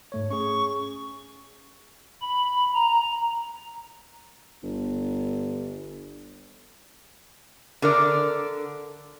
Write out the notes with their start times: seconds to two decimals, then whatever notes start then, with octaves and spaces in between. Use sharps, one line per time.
0.12 G#2 A3 C#5
0.30 C#4 G#4 C#6
2.22 B5
2.75 A#5
4.63 G1
7.82 D3 A#4 D5